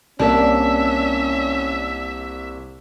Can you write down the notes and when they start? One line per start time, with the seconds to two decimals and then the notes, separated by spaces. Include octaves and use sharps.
0.19 C2 A#3 C#4 D4 D5 E5